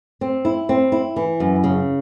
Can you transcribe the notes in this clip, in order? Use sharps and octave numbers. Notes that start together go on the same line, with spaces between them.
C4
E4
C4
E4
E3
F#2
C#3